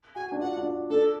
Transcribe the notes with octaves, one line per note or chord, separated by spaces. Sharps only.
F#4 G#5
D4
F4 F#5
D4
F4
D4 A4